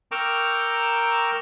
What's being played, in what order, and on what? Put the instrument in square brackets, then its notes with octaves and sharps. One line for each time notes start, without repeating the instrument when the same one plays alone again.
[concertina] A#4 G5 A#5 C#6 D6 E6